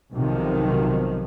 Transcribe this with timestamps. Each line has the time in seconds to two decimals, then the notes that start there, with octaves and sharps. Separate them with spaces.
0.13 B1 C3 D#3 F3